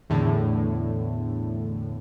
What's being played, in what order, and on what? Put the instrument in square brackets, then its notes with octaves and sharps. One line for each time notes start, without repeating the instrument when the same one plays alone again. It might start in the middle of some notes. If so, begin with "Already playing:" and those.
[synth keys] E2 A2 D3